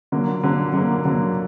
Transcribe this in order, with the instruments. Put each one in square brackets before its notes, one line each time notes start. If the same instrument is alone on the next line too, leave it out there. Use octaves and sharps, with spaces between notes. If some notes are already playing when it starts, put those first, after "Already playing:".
[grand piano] D3 F#3 A#3
D3 F#3 A#3
D3 F#3 A#3
D3 F#3 A#3